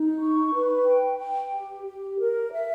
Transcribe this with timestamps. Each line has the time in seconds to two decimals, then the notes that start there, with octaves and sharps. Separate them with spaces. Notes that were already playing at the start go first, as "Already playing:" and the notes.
Already playing: D#4
0.20 C#6
0.53 B4
0.86 G5
1.19 G5
1.52 G4
1.85 G4
2.18 A#4
2.51 E5